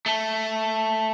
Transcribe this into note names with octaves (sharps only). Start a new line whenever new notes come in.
A3